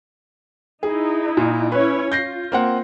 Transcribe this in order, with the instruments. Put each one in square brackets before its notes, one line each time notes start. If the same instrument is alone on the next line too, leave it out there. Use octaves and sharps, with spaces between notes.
[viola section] D#4 E4 [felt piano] G#4
[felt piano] A#2
[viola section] C#4 E4 C#5 [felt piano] B4
[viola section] F4 [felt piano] G6 A#6 C7
[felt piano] A#3 C4 F#5